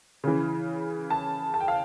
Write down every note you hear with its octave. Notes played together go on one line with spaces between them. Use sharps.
C#3 E3
A5
A5
G5
F5